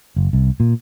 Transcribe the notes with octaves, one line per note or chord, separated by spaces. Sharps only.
F#1
C2
A#2